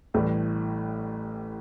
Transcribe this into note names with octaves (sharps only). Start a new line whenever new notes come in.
A1 A2 E3 G3